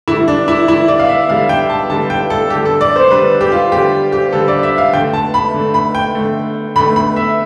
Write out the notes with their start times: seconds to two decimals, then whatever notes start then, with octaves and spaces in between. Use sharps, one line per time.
0.08 D3 E4
0.12 G3
0.28 D4
0.48 E4
0.68 D3 G3 E4
0.88 D5
0.99 F5
1.09 E5
1.29 D3 G3 F5
1.49 G5
1.70 A5
1.90 D3 G3 A5
2.10 G5
2.30 A4
2.50 G3 G4
2.55 D3
2.65 A4
2.81 D5
2.96 C5
3.11 D3 G3 B4
3.41 G4
3.52 F4
3.72 D3 G3 G4
4.12 G4
4.33 D3 G3 A4
4.48 D5
4.63 E5
4.78 F5
4.93 D3 A3 G5
5.14 A5
5.34 B5
5.54 D3 A3
5.74 B5
5.95 G5
6.15 D3 A3
6.76 D3 B5
6.79 A3
6.96 B5
7.16 E5